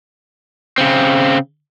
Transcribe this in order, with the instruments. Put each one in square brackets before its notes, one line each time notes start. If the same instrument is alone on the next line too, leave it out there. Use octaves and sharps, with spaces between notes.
[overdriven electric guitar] C#3 C4